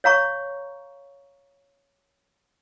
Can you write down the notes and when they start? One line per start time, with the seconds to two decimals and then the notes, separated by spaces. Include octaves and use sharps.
0.04 C#5 F5 A#5 C#6